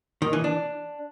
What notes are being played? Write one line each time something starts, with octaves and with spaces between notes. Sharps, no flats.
D#3
E3
D4